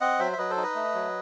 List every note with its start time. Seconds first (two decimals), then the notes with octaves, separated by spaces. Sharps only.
0.01 C4 D#5 F#5
0.19 F#3 C5 E5
0.33 E5
0.38 F#3 B4 D#5
0.50 A4 C5
0.57 D#4
0.63 B4 D#5
0.75 A3
0.94 F#3